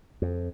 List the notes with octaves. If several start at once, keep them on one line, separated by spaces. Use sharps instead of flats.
F2